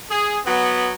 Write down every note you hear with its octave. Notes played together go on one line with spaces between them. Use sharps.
G#4
F#3 B3